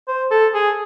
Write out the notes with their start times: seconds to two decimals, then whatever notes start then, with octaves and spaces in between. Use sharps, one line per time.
0.08 C5
0.31 A4
0.54 G#4